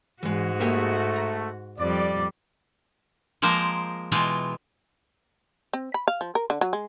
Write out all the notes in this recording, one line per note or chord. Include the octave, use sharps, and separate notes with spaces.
G#2 E3 G#3 F#4
A3 A#3 G4 G#4
A#5
F2 G3 D5
F3 G#3 A#3 A#4 C5 A#5
B2 E3 G#3 F4 G5
C4
B5
F5
F3
A#4
D3
F#3
G#3